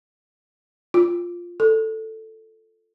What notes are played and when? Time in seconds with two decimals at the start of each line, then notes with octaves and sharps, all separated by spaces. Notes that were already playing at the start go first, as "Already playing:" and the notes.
0.94 F4
1.60 A4